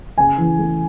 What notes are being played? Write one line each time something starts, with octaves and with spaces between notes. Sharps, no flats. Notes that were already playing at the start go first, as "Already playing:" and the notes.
C#3 G#5
E3
A3